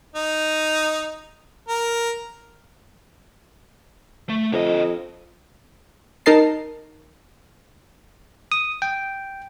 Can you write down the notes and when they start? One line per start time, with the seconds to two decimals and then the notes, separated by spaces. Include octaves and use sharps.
0.16 D#4
1.68 A#4
4.29 A3
4.53 F2 D3 D#5
6.26 D#4 A#4 D#5 A5 C7
8.52 D#6
8.82 G5